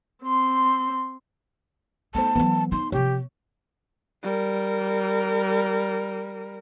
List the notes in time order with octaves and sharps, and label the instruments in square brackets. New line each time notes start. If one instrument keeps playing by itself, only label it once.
[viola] C4 C6
[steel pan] A3 C5 [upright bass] B3 D#4 [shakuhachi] A5
[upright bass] E3 F#3 [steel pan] B3
[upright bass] D#4 [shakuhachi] C6
[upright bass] C3 F3 [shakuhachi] G4 [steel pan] C#5
[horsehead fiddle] G3 A#4